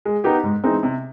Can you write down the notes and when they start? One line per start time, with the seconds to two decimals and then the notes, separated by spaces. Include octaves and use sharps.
0.05 G#3
0.24 B3 D#4 G4 A#4
0.43 G#2
0.64 E3 G#3 C4 D#4
0.83 C3